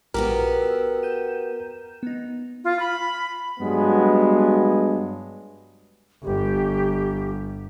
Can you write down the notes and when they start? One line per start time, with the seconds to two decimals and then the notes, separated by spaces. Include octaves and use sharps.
0.14 A#1 B3 F#4 G4 A#4
0.62 E6
1.02 G6 D#7 E7
2.03 B3 D#4
2.64 F4
2.80 B5
3.60 G2 F#3 G#3 B3
6.24 G1 G4